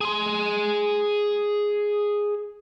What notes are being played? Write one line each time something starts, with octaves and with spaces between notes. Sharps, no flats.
G#4 C6